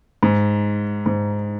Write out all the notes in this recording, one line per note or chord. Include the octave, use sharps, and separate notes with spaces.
G#2
G#2